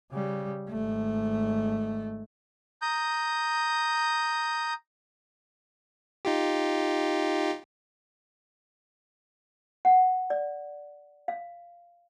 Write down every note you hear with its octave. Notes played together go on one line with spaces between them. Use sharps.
C#3 G3
G#1 A3
A#5 D#6 G6
D#4 F4 G4
F#5
D5
F5